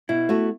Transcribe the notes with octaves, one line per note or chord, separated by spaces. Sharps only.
B2 E4
A3 F#4